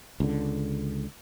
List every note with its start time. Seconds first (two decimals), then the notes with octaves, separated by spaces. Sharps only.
0.20 C#2 D3